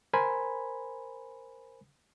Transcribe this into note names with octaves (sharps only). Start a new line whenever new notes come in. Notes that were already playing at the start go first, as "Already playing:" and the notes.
A#4 C5 G#5 B5